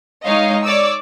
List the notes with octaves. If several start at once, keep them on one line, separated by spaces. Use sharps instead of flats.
G#3 D#4 C#5 D#5 F5
C#5 D5 D6 E6